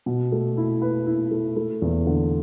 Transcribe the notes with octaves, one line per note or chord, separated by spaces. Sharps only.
B2
A3
E4
B4
E4
A3
A3
E2
D3